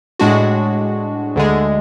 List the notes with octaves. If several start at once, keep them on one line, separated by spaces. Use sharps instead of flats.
A2 G#3 D4 F#4
D2 D3 G#3